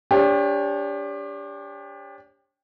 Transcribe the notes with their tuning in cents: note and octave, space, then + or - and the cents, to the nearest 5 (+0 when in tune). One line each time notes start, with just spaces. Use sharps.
D4 -30 G4 +25 C#5 -35